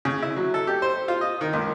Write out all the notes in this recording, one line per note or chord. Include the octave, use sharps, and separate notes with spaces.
C#3
E4
F#3
A4
G4
C5
F4
D#5
D#3
C#2